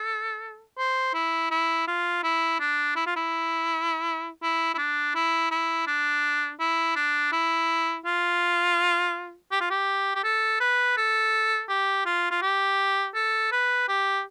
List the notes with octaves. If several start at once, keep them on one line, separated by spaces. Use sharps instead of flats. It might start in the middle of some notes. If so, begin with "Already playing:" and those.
Already playing: A4
C5
E4
E4
F4
E4
D4
E4
F4
E4
E4
E4
D4
E4
E4
D4
E4
D4
E4
F4
G4
F4
G4
G4
A4
B4
A4
G4
F4
F4
G4
A4
B4
G4